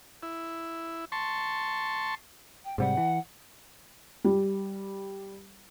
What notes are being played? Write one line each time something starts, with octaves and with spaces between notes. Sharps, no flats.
E4
A5 C6 C#6
G5
G#2 C3 G3 F#5
E3
G3